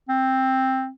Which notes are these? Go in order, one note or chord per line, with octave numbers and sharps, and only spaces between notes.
C4